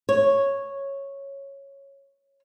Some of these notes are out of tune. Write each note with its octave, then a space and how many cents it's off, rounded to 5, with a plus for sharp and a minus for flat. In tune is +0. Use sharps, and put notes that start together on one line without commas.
C#5 -5